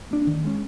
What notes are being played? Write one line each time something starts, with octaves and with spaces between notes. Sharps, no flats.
A#3 D4
D#3
G#3 C#4